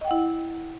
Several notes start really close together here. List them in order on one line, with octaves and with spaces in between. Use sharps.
D#5 G5 F#5 E4